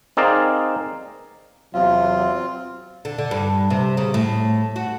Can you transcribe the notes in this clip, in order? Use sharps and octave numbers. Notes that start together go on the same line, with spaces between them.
C4 D#4 G#4 A#4 D5 F5
E2 C3 F#3 C4 F4 F5
D3
D3
G2
C3
C#3
A2
F#4